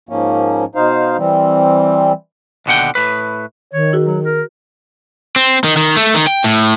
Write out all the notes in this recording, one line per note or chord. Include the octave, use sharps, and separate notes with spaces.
G#2 F3 A#3 C#4
B2 D#4 C5 F5
E3 G3 C4
D#2 B2 D3 F#5 G5
A2 B4
D#3 C#5
F#4 G#4
F#3
A#4
C4
D#3
D#3
A3
D#3
G5
A2